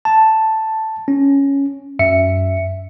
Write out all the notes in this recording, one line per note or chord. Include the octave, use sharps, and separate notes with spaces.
A5
C#4
F#2 E5 C#7